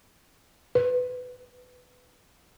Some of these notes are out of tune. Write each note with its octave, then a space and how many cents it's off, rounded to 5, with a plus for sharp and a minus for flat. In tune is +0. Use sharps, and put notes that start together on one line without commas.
B4 +15